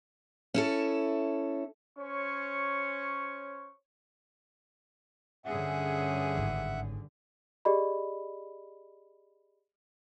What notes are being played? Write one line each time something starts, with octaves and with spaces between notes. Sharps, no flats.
C#4 E4 A4
C#4 C5 C#5 C#6
G2 D3 C#4 G#4 E5 F#5
G#1 G#2
G4 G#4 D5 D#5 B5